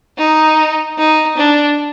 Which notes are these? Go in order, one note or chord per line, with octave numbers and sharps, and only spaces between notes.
D#4
D#4
D4